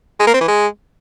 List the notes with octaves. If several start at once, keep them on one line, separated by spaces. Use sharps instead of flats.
G#3
A#3
C4
E3
G#3